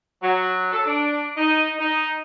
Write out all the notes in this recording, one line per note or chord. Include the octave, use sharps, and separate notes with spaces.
F#3
A4
D4
D#4
D#4